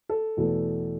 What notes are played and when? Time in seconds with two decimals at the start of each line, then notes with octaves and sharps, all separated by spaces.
0.09 A4
0.37 E2 B2 A3